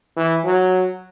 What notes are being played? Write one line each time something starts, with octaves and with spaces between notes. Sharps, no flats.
E3
F#3